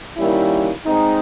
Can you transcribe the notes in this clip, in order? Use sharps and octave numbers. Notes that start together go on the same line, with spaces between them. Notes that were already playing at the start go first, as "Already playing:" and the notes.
D#3 G3 A#3 C#4 E4
G#3 C4 D#4